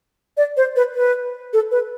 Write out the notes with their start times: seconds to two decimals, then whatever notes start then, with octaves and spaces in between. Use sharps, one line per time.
0.37 D5
0.57 C5
0.76 B4
0.95 B4
1.53 A4
1.71 B4